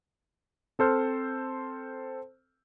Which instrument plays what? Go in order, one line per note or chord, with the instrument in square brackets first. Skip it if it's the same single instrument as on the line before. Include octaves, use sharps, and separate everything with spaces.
[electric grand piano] C4 A4 C5 F6